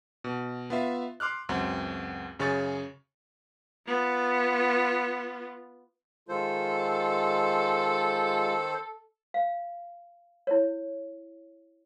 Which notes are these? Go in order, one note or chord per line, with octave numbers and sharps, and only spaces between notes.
B2
B3 F4 E5
C6 D6 F6 F#6
C#2 F#2 C4 F#4
F#2 C#3 G#4 C#5 C#6 A6
B3 F4
D#3 G#3 F4 A4 C5
F5
E4 C#5